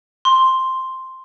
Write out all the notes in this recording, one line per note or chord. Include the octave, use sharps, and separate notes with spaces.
C6